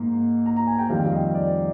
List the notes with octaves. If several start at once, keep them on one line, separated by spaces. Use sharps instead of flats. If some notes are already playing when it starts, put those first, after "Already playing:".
Already playing: G#2 A#3
A#5
A#5
G#5
G5
F2 D#3 G3 C4 F5
D#5
D5